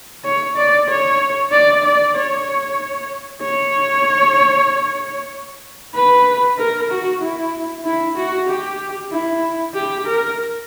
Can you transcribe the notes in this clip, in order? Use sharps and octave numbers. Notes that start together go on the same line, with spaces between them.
C#5
D5
C#5
D5
D5
C#5
C#5
B4
A#4
F#4
E4
E4
F#4
G4
E4
G4
A#4